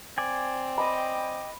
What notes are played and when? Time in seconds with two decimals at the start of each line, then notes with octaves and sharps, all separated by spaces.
0.18 C4 D5 G#5
0.78 D#5 G5 B5 D6